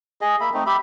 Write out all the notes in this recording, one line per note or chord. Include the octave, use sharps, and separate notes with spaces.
G#4 D#5
A#3 E5 B5
A3 C4 D#4
G4 E5 B5